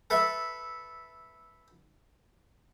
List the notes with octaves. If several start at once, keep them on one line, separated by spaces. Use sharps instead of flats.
A4 B4 E5